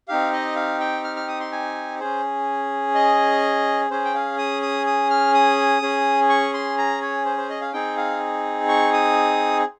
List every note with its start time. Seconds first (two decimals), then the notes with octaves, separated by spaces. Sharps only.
0.08 C4 D#4 G4 F5
0.33 D#5
0.56 F5
0.80 G5
1.04 F6
1.16 F6
1.28 D#6
1.40 C6
1.52 G#5
2.00 C#4 G#4 C5
2.95 D#5
3.91 C#4 G#4 C5
4.05 G5
4.14 F5
4.38 D#6
4.62 D#6
4.86 D#6
5.10 F6
5.34 D#6
5.82 C#4 G#4
6.29 C#6
6.54 C6
6.78 A#5
7.01 C#5
7.25 C5
7.37 C5
7.50 D#5
7.61 F5
7.73 C4 D#4 G#4 G5
7.97 F5
8.68 C#6
8.93 D#6